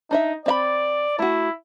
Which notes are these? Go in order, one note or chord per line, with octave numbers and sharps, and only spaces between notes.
D4 D#4 D#5 E5
C4 D5 E5 B5
A3 E4 F#4